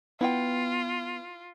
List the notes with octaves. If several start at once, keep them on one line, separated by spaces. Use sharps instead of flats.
B3 E4 F4 F#5 G5